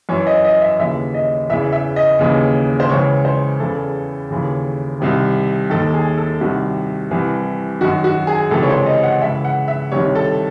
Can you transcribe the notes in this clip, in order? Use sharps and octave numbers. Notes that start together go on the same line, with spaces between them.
F#2 E3 C#5
D#5
D#5
E5
D#2 C#3 E3 E5
D#5
E2 C#3 E3 E5
E5
D#5
D#2 C#3 E3
C5
C#2 C#3 E3 C#5
C5
E2 C#3 E3 A4
D#2 C#3 E3
C2 C3 D#3
D#2 D#3 A4
G#4
A4
C2 C3 D#3 F#4
C2 C3 E3
F#2 D#3 F#4
F#4
G#4
C#2 C3 E3 A4
C#5
C5
D#5
F#5
C#2 C#3 E3 E5
F#5
E5
C2 C3 D#3 C#5
A4